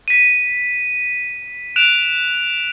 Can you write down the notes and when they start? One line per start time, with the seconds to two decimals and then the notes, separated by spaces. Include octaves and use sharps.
0.08 B6 D#7
1.76 F#6 D7 E7 F7